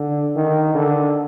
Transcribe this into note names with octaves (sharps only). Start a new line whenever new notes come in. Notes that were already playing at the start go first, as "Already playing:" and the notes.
Already playing: D3
D#3
D3